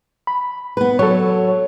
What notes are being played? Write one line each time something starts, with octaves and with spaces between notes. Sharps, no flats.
B5
B3 B4
F#3 A4 C#5